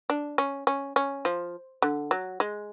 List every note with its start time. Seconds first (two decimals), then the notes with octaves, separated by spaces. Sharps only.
0.10 D4
0.38 C#4
0.67 C#4
0.96 C#4
1.25 F3
1.82 D3
2.11 F#3
2.40 G#3